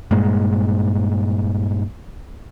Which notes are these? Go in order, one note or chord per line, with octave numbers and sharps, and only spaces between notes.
G2 A#2 G#3